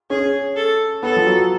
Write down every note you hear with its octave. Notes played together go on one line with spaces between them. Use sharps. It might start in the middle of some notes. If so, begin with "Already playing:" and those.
C#4 G#4
A4
B3 A4
F3
F#3